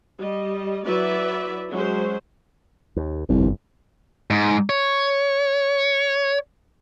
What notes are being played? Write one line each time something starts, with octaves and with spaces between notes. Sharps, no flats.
G3 D#5
F#3 E4 F#4 B4 D5 E5
F#3 G#3 C#4 C5
D#2
G1 C2 F2
G#2
C#5